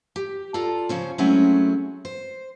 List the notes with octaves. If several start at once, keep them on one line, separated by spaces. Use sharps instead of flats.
G4
F4 A4 D5 A#5
C#3 F3 C#4 C5
F#3 G#3 A3 C4 C#4 E4
C5